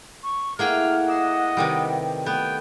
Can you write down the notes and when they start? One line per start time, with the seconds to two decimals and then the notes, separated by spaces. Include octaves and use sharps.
0.23 C#6
0.59 A3 A#3 E4 G#4 A#4 F#5 G5 F6
1.08 D#5 D6 E6 C7
1.57 C3 D#3 G3 A3 B4
2.26 A3 B3 G5